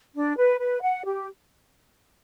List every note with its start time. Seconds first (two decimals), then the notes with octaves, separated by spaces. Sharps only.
0.14 D4
0.37 B4
0.59 B4
0.82 F#5
1.05 G4